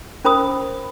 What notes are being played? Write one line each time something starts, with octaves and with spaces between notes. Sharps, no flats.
C#4 A#4 C5 B5 D#6